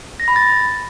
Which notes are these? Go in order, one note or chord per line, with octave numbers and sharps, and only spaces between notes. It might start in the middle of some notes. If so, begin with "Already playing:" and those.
A#6
B5
A6